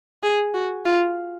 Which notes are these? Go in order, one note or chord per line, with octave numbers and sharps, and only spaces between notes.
G#4
F#4
F4